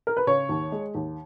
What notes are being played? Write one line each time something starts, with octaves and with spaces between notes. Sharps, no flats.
A#4
B4
C#3 C#5
D#2
G#3
D#2